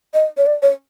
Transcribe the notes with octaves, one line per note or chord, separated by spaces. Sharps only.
D#5
C#5
D5
C#5